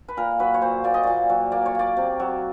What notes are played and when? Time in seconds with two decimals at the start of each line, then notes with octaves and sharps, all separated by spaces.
0.08 B4
0.17 A#2 A#4
0.39 F#3 B4
0.54 C#5
0.62 A#2 C5
0.84 A#2 D5
0.94 D#5
1.03 A#2 D5
1.29 F#3
1.52 A#3 D5
1.66 C#5
1.75 A#3 D5
1.97 C3
2.20 F#3